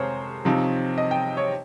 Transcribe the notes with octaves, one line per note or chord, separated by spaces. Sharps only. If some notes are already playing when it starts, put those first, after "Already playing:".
Already playing: F2 C3 G#3 G#4 A#4 C5 C#5
C3 F3 C4 D#4
D#5
G5
C#5